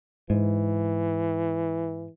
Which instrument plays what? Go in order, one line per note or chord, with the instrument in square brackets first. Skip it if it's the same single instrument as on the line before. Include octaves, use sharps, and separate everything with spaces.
[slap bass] G#2 [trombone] E3